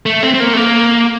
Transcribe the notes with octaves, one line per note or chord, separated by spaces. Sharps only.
A3
C4
C4
A#3
A3
A#3